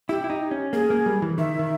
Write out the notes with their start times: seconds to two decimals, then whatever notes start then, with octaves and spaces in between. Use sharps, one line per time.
0.09 E4 G4
0.24 E4
0.30 D#4
0.51 C#4
0.73 A#3 G#4
0.90 A#3
1.06 G3
1.22 E3
1.38 D#3 E5
1.59 D#3